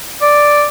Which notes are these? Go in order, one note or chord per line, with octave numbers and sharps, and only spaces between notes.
D5